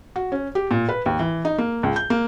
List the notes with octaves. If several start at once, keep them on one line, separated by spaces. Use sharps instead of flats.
F#4
C#4
G4
A#2
B4
D#2
E3
D#4
A#3
C#2
G6
A#3